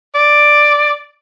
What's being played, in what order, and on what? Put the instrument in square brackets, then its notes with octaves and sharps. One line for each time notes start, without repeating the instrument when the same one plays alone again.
[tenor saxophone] D5